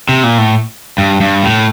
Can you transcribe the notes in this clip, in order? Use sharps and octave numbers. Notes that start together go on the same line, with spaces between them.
C3
A#2
A2
G2
G2
A2